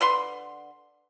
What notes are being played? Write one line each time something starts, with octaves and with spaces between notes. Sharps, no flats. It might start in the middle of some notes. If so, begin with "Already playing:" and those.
D3 B4 C6